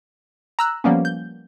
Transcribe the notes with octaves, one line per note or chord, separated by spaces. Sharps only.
A#5 E6 F#6
F3 G3 A#3 B3 C#4
G6